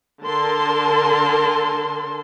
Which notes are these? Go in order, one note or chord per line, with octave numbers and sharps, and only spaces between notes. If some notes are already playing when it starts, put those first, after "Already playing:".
D3 A#4 A5 C6